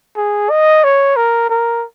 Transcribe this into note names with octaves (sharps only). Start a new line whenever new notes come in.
G#4
D#5
C#5
A#4
A#4